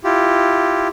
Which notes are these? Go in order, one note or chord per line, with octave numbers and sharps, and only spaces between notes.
E4 F4 G4